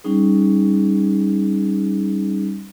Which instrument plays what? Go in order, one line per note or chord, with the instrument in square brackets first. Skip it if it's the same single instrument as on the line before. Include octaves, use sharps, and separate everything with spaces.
[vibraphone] G3 C#4 D#4 G#4